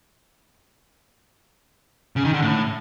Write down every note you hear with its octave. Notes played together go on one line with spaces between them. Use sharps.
C#3
D#3
D3
A2